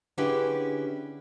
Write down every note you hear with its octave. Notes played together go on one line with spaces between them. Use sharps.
D3 C#4 E4 G4 G#4 B4